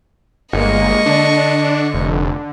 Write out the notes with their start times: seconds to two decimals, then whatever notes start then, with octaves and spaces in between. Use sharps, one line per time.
0.53 G1 G#3 A#3 D#5 C#6
1.06 D3 D4
1.94 F1